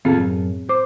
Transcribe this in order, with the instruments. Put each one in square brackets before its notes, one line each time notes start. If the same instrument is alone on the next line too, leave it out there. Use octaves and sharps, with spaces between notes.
[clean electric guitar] D#2 F4 A4 [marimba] A2 B3 C4
[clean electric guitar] F#2
[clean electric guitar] C5 [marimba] D6